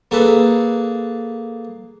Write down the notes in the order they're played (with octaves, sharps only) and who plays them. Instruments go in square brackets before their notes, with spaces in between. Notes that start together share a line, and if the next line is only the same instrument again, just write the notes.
[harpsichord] A#3 G#4 A4 B4